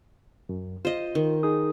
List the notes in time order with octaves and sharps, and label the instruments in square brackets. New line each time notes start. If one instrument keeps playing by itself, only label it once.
[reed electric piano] F#2
[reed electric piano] F4 [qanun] C5 D#5
[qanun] D#3
[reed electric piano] D#4 G#4 D#6